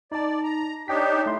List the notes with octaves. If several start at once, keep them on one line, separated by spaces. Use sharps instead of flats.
D#4 D5 A5
A#5
D4 D#4 G4 C#5 G5 B6
A3 E4 C6